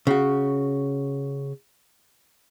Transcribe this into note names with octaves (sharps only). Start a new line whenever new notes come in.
C#3 F#4